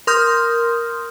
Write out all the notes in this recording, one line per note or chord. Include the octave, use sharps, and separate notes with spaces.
A#4 C6 D#6 F6 G6